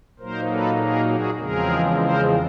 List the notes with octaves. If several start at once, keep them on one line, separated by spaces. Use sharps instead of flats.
A#2 F#3 A#3 D#4 A#4 C5
A4 B4
G#4 A#4
F#4 G#4
E2 C#3 F3 G#3 C4 G#4 A#4
A#4 C5